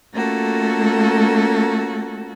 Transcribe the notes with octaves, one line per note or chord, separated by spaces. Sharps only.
A3 A#3 C#4 F4 F#4 A4